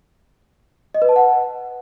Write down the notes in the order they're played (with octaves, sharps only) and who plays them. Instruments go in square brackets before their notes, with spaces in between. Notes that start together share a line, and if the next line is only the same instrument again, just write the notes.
[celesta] D#5
B4
A5
F#5